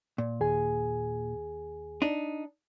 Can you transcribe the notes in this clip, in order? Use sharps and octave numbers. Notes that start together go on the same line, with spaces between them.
A#2
D#2 G#4 G#5
D4 D#4